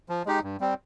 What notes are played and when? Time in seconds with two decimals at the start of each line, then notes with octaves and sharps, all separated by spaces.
0.09 F3
0.26 G#3 D#4 G4
0.43 G2
0.61 G3 C4